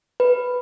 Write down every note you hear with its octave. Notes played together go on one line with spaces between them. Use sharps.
B4